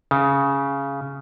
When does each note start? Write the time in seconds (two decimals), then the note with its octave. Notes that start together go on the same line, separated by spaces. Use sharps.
0.11 C#3